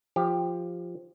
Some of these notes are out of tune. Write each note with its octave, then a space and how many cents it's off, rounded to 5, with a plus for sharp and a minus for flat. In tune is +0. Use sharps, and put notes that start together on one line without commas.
F3 +0 G4 +15